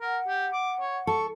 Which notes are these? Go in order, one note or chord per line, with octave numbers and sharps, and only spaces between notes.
A#4 F#5
G4
D6
C#5
A4 C#6